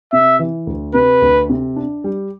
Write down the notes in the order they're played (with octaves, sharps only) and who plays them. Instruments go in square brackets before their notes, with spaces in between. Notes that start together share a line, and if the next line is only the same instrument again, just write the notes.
[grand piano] C3 [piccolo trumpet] E5
[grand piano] E3
D2
[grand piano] C3 [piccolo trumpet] B4
[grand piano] D2
C3
D4
G3